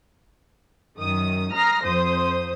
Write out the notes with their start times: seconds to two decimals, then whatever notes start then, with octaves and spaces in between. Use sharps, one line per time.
0.98 F#2 D#3 D#6
1.52 A#5 D#6 F6 A#6 C7
1.84 F2 C5 D#6